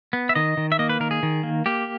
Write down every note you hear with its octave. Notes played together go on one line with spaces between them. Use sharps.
B3
E5
D#3 D#5
D#3
E5
A#3 D#5
B4
D#3 A#4
G#4
D#3
A#3
A#3 G4